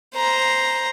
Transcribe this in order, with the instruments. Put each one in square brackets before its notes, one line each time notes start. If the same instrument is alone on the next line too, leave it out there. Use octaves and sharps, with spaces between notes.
[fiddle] C5 A#5